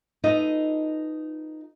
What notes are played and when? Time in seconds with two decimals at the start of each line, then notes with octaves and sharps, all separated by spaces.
0.24 D#4 F4 A4 B4 D#5